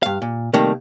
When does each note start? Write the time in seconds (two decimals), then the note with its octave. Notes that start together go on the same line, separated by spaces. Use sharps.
0.03 G2 F5
0.22 A#2
0.53 C3 D#3 G3 A3 A#3